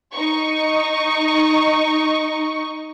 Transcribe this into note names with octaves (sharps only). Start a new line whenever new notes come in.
D#4 C#6